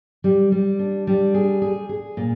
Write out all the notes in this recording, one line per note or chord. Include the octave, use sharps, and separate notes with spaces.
G3
G3
D4
G3
G#4
G#4
G#4
A#2